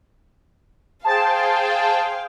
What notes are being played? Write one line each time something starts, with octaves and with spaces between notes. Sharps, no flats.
G#4 C5 F5 G5 A5